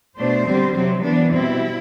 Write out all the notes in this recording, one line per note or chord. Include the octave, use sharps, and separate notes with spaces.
B2 A3 D4 C5
D3 G3 C4
C3 F#3 C4
E3 B3 D4
B2 G3 C4 E4